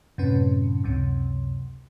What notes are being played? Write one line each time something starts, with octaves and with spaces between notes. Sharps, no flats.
F#2 A2 C3 C#4 B4
C#2 F#2 C3